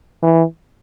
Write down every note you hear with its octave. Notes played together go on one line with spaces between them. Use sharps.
E3